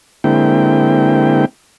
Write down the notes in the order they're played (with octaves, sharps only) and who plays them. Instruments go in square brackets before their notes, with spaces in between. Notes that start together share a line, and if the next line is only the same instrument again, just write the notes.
[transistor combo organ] D3 G#3 A#3 C4 E4 G5